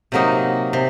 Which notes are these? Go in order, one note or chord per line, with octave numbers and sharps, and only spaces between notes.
C3 F#3 A#3 D#4
C3